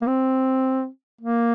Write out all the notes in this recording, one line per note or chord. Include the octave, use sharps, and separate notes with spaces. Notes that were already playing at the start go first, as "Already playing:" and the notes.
A#3
C4
A#3